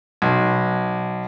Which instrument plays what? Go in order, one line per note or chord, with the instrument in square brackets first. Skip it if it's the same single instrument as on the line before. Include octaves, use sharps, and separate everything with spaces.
[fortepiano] B1